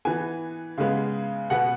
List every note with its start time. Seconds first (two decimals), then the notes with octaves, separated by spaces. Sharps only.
0.05 E3 B3 G#5
0.78 C#3 G#3 B3
1.50 B2 B3 F#5